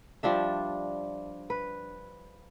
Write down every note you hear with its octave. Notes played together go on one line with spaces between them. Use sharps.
F3 G3 D4 E5
B4